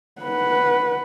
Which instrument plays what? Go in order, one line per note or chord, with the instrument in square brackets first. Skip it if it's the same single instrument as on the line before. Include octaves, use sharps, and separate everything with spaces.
[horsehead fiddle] B4 F#5